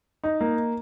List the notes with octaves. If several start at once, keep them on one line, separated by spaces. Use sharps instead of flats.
D#4
A#3